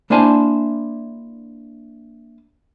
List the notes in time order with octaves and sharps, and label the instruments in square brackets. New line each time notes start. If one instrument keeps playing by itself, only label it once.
[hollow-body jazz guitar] A#3 D4 E4 C5 G#5 A5